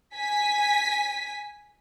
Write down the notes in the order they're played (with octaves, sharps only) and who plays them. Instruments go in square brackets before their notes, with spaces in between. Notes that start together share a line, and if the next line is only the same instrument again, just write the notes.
[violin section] G#5 B6